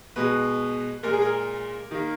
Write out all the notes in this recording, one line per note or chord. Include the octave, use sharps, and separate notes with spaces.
B2 G#3 B4
A#2 G#3 A#4
G#4
A#4
D#3 A#3